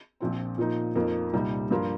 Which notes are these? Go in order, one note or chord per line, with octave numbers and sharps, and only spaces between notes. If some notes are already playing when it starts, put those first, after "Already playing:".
A#1 A#2 F3 C4
A#2 F3 A#3 D#4
F2 F3 A#3 D#4
C2 A#2 G3 D#4
G2 F3 A#3 F4